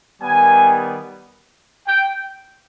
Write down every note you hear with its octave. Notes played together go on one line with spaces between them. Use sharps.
D#3 G3 B3 G#5
G5